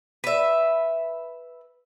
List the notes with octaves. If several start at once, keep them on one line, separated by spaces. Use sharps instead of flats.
B4 E5